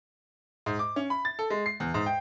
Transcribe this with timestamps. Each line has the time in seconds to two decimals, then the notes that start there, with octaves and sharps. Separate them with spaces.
0.66 G#2
0.79 D6
0.96 C#4
1.10 B5
1.25 A6
1.39 A4
1.50 G#3
1.66 C7
1.80 E2
1.94 G#2
2.06 G5